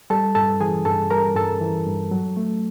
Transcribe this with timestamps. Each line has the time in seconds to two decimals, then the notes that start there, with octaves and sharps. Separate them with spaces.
0.10 G3 A4 A5
0.35 G2 A4 A5
0.61 E3 G#4 G#5
0.85 G2 A4 A5
1.10 G3 A#4 A#5
1.36 G2 A4 A5
1.61 E3
1.86 G2
2.11 F#3
2.37 A3